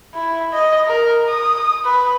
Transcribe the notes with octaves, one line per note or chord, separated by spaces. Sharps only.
E4
D#5
A#4
D#6
B4